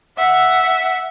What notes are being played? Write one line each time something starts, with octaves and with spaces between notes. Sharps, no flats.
E5 F#5